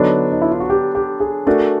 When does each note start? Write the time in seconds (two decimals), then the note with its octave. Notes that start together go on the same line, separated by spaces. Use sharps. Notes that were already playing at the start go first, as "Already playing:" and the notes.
Already playing: D3 F#3 B3 D4 D#4
0.32 D#4
0.42 E4
0.51 F4
0.60 F#4
0.70 G4
0.95 G4
1.20 G#4
1.47 A3 D4 F#4 A#4